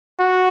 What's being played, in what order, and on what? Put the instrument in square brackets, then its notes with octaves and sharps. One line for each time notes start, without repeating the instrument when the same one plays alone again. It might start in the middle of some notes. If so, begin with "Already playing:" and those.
[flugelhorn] F#4